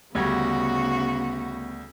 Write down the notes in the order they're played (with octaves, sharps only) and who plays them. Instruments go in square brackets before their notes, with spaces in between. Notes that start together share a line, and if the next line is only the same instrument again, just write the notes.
[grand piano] D2 G3 G#6 [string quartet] C#3 F#4 [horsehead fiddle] B3